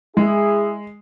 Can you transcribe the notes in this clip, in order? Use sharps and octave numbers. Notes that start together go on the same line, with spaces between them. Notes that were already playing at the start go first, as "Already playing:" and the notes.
G#3 E4 G#4